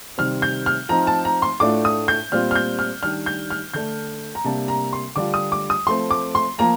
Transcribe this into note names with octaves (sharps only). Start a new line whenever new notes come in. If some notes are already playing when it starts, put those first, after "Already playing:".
C3 D#3 G3 C4 F6
G6
F6
F3 C4 D#4 A#5
A5
A#5
C6
A2 A3 D4 F4 D6
D#6
G6
A#2 G3 C4 F4 F6
F6
G6
F6
D#3 G3 D4 F6
G6
F6
D3 A3 D4 G6
A#5
C3 G3 A#3 D4 A5
A#5
C6
D3 G3 D4 F4 D6
D#6
D6
D#6
F3 A3 C4 C6
D6
C6
F3 A#3 F4 A#5